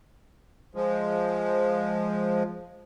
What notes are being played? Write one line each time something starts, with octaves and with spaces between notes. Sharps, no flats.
F3 G#3